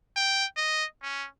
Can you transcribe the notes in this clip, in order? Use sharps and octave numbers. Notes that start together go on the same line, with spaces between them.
G5
D#5
C#4